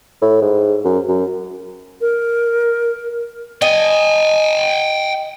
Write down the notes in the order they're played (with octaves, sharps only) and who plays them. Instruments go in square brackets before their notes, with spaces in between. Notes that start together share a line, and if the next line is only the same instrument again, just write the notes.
[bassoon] A2
G#2
F#2
F#2
[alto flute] A#4
[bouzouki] D#5 [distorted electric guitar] G5 G#5